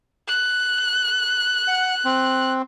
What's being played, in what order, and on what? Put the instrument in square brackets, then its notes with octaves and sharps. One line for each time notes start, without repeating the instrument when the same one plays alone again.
[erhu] F#6
[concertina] F#5
C4